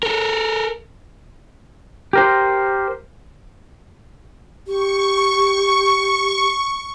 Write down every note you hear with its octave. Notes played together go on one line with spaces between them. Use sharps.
A4 A#4
G4 A#4 C5
G4 C#6